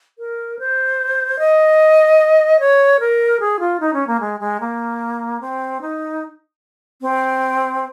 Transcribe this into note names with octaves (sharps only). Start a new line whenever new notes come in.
A#4
C5
D#5
C#5
A#4
G#4
F4
D#4
C#4
A#3
G#3
G#3
A#3
C4
D#4
C4